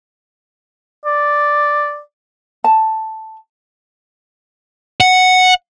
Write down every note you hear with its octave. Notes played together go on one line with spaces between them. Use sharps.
D5
A5
F#5